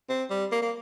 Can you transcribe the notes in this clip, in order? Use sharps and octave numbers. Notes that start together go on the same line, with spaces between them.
C4
G3
A#3
A#3